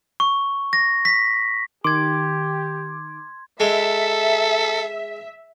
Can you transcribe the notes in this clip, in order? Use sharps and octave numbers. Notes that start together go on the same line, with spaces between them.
C#6
A#6
B6
D#3 G4 C6 D6 G#6
G#3 A4 E5